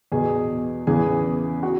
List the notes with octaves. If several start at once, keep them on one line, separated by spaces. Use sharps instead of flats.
E2 B2 G#4
E2 C#3 E3 G#4
F#4